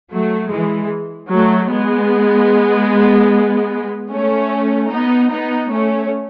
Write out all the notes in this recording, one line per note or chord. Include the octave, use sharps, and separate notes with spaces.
F#3 A3
E3 G#3
F#3 A3
G#3 B3
A3 C#4
B3 D#4
B3 D#4
A3 C#4